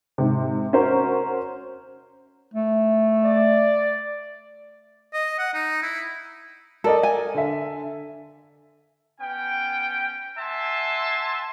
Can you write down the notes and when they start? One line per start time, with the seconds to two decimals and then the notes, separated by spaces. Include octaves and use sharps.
0.18 G#2 C3
0.73 C#4 F#4 A#4 C5
2.54 A3
3.25 D5
5.13 D#5
5.39 F#5
5.54 D#4
5.82 E4
6.84 A4 A#4 D5 D#5
7.03 G#5
7.35 D3 E5
9.20 B3 C#4 G5
10.38 E5 F#5 G#5 A5 C6